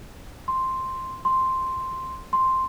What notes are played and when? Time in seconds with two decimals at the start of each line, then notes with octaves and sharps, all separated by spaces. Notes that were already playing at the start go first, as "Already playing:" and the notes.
0.48 C6
1.25 C6
2.33 C6